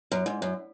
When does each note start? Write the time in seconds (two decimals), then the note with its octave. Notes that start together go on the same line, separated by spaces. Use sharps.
0.12 F#2
0.26 G#2
0.42 F#2